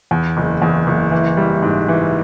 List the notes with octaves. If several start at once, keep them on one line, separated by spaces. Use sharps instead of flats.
E2
F#1
E2
F#1
E3
G3
G#2
E3